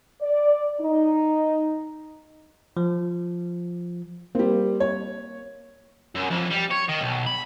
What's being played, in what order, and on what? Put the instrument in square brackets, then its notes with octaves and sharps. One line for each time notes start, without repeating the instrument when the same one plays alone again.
[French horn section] D5
D#4
[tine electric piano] F3
[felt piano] G3 C4 [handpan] A#3
[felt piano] C#5
[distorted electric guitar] F#2
F2
G3
C#5
D#3
B1
B5